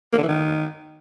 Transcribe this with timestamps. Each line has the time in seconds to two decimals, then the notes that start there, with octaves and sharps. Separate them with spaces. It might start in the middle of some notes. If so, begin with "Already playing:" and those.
0.13 A#3
0.18 D3
0.23 E3
0.28 D#3